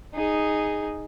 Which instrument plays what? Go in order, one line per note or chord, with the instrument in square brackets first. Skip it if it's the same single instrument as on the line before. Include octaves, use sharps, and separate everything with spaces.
[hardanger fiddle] D#4 G#4